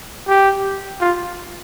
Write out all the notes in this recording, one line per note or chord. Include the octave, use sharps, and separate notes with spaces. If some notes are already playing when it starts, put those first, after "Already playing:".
G4
F4